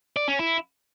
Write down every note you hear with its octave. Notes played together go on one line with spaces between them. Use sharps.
D5
C#4
E4